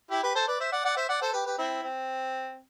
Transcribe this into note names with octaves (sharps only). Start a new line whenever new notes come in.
E4 G4
G4 B4
A4 C5
B4 D5
C5 E5
D5 F#5
D5 F#5
C5 E5
D5 F#5
A4 C5
G4 B4
G4 B4
C4 E4
C4